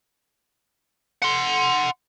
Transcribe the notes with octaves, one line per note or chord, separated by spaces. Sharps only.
F#5 C6